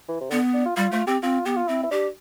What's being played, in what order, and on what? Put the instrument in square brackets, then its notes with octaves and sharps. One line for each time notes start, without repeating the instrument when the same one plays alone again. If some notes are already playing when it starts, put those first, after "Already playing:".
[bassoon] E3
C3
[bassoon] D3 [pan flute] B3
[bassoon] D4
F4
[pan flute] G3 [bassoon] F4
[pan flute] A3 [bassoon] F4
[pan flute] C4 [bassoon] G4
[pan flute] C4 [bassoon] F4
[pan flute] B3 [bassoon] G4
[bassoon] F4
[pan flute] C4 [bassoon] E4
[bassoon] E4
[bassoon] D4 [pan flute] G4